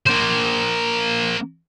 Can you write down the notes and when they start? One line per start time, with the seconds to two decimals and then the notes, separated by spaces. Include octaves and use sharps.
0.07 A#3 C5